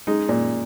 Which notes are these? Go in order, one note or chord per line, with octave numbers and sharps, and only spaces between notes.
G#3 D#4
A#2